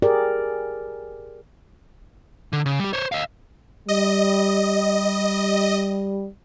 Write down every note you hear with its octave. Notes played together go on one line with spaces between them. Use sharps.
G4 G#4 A#4 D5
D3
C#3
G3 G4
C5 C#5
D#5 F5
G3 D#5